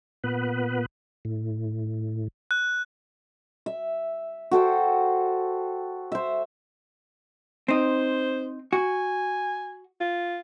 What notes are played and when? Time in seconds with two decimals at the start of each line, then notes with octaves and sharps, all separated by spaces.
0.24 A#2 B3 B4
1.25 A2
2.51 F#6
3.66 E5
4.51 F#4 A4 C5 G5
6.12 C5 E5
7.68 C4 D#4 C5
8.73 F#4 G#5
10.01 F4